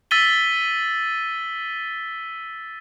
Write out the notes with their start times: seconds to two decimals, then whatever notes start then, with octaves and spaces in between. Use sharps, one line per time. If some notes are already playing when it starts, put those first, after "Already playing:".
0.11 E6 A6 B6 D#7 G7